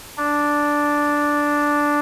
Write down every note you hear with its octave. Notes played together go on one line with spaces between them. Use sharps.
D4